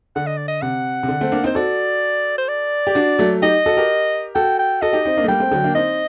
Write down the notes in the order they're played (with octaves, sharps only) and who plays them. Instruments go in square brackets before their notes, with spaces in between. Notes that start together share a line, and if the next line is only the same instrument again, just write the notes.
[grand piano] D3 [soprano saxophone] F#5
[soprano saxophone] D#5
D5
D#5
[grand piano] C3 [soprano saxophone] F#5
[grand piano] C3
D3
A3 C4
A#3 D4
[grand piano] C4 D#4 [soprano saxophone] C5
[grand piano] F#4 A4 [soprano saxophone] D5
[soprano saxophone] C5
D5
[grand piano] G4
D4 F#4
F#3 A3
[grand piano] D#4 G4 [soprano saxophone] D#5
[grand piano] F#4 A4
G4 A#4
[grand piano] F#4 A4 [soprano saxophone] G5
[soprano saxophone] G5
[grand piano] F#4 A4 [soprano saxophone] D#5
[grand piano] D#4 G4
C4 D#4
A#3 D4
A3
[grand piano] G3 A#3 [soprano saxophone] G5
[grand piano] A3 C4
D3 F#3
A#3 D4
[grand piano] C4 D#4 [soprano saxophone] D#5